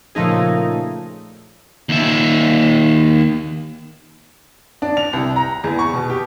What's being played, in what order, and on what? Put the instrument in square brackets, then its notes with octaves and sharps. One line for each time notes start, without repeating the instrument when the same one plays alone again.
[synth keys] A#2 C#3 F3 A3 D#4 G#4
[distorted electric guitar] D#2 E5
[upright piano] D4
F7
C2
A#5
E2
C#6
B2
G4